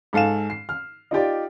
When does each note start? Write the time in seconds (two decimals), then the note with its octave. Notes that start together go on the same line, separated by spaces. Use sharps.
0.13 G#2 A4 F5 G#5 E7
0.50 C7
0.69 F6
1.11 D#4 F4 G4 D5